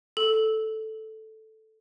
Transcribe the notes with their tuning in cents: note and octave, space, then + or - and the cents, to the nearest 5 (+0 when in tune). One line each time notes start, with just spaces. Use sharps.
A4 -5